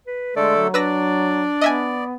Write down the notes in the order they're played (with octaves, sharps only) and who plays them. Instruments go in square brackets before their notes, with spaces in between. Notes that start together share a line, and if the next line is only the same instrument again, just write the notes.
[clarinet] B4
[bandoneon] D3 A3 A4 [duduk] G#3 [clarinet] D5
[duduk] F#3
[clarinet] D4 [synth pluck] B4 E6 A#6 [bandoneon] D5
[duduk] B3 [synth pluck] D#5 E5 G#5